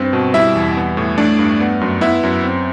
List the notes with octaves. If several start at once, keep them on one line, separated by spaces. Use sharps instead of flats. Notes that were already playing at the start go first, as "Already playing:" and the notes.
Already playing: G2 C4
B2
G3 E4 E5
E2
B3
A2
A3 D4 D5
G2
B3
F#2
B3 E4 E5
F#2
C4